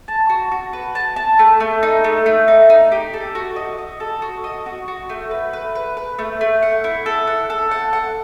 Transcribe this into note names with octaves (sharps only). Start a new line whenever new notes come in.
A5
F#4
F#4
B4
A5
A5
A3
A3
D#4
A3
A3
D#4
D#4
G4
A4
F#4
D#5
D#5
A4
F#4
D#5
F#4
F#4
A3
B4
B4
B4
B4
A3
A3
F#5
E4
A4
F#5
A4
F#5
F#5